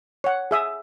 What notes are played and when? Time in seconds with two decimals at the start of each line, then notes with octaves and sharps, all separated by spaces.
0.24 C#5 F#5
0.51 G#4 E5 D#6